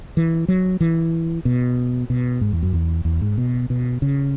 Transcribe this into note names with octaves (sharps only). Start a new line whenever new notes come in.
E3
F#3
E3
B2
B2
G#2
E2
F#2
E2
E2
G#2
B2
B2
C#3